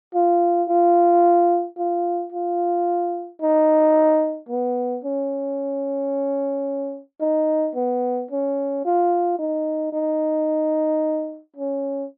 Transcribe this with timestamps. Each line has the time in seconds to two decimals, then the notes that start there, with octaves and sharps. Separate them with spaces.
0.14 F4
0.69 F4
1.78 F4
2.33 F4
3.41 D#4
4.49 B3
5.04 C#4
7.21 D#4
7.76 B3
8.31 C#4
8.85 F4
9.39 D#4
9.93 D#4
11.56 C#4